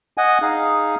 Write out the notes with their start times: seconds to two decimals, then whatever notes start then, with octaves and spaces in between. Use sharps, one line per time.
0.18 D#5 F#5 G#5
0.42 D#4 G#4 F5